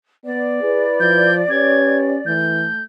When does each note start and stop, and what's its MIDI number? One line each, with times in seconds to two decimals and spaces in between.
0.24 0.61 59
0.24 2.34 74
0.62 1.34 64
0.62 0.85 68
0.62 1.34 71
1.00 1.43 53
1.00 1.34 91
1.50 2.21 61
1.50 2.16 67
1.50 2.16 71
1.50 2.16 73
1.50 1.98 92
2.26 2.68 52
2.26 2.81 57
2.26 2.83 91